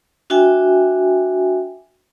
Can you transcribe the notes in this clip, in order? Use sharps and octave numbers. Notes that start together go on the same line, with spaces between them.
D4 F#4 E5 G5 G#5